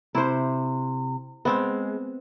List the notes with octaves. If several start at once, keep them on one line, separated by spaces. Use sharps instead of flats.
C3 E4 C5
G#3 B3 C4